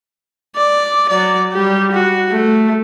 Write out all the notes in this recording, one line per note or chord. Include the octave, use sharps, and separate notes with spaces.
D5
F#3 D5
G3 G4
F#4
A3